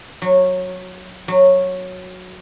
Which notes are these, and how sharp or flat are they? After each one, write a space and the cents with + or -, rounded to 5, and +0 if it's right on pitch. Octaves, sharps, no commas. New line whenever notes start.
F#3 -15
F#3 -10